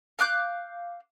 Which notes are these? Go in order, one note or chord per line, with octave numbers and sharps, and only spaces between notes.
F5 D6 F#6 G6